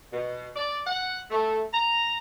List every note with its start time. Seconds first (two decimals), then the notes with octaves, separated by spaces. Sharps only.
0.12 B2
0.56 D5
0.86 F#5
1.30 A3
1.73 A#5